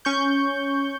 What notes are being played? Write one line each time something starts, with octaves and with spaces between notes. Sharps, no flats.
C#4 C#6 G6